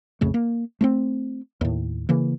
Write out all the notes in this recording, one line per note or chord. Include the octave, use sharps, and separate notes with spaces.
A#1 F2 C#3 A3
A#3
A3 B3 C4
D#2 A2
C#3 E3 A#3